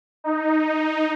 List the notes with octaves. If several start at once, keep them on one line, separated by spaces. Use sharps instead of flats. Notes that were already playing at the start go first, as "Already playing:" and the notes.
D#4